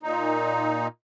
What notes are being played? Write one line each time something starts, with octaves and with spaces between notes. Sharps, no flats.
A#2 D#4